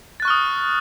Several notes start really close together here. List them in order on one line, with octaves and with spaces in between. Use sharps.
A6 F#6 C#6 F6 D#6